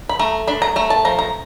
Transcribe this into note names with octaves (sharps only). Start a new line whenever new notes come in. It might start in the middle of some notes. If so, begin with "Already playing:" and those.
B5
A3 A#5
D4 B5
A#5
A3 A#5
A5
F3 A#5
A#5